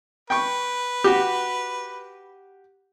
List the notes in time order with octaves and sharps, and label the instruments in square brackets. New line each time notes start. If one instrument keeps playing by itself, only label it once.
[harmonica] B4 [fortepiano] G5 C#6
[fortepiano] F#4 G4